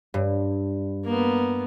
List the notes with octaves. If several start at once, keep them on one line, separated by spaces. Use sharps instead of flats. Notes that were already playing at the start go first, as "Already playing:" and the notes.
G2
A#3 B3